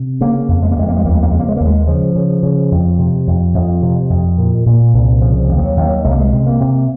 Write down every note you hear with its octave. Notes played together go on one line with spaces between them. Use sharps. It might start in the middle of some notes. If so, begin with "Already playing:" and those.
Already playing: C3
C#3 A#3
F2
G#3
A#3
F2 G#3
A#3
G#3
D#2 A#3
G#3
A#3
C#3 G#3
A#3
G#3
D#2 A#3
G#3
C#3 F3
C#3
C#3
F2
C3
F2
F2
C3
F2
A#2
A#2
C2
C#3 F3
D#2
F3
F#3
D#2
C2 G#3
A#3
G#3
C3
A#3
C3